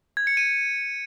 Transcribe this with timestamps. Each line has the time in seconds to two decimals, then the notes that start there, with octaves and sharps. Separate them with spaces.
0.17 G#6
0.27 C#7
0.37 D#7